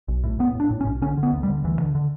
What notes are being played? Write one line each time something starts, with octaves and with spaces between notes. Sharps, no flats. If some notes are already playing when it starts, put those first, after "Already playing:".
B1
A2
A2 B3
A2 D4
A2
C#4
B1
D3 C#4
D3
B3
D2
G3
D3
D2 E3
D3
D3